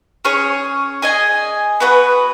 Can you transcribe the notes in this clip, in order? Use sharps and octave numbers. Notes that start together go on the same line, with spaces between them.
C#4 G#4 C#5
G#4 D#5 G#5
B3 F#4 B4